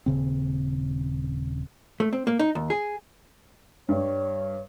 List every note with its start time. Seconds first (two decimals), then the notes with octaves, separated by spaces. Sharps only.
0.06 D#1 C#3 C4
2.00 A3
2.13 C4
2.27 A#3
2.39 D#4
2.55 D#2
2.70 G#4
3.89 G2 G3 C#5